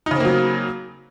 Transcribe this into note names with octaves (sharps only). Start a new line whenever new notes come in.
C#3 F#3 A#3 C4 D#4